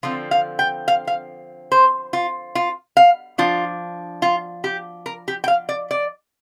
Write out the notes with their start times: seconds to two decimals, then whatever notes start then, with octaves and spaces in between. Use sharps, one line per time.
0.03 D3 F3 C4 F4
0.31 F5
0.59 G5
0.88 F5
1.07 F5
1.72 C5
2.13 F4
2.55 F4
2.97 F5
3.38 F3 D4 F4
4.22 F4
4.64 G4
5.06 A#4
5.28 G4
5.44 G5
5.48 F5
5.69 D5
5.91 D5